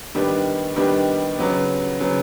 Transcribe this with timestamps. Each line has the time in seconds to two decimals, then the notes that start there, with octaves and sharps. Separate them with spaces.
0.15 D#3 G3 B3 D4
0.76 D#3 G3 B3 D4
1.39 C#3 F#3 B3
2.00 C#3 F#3 B3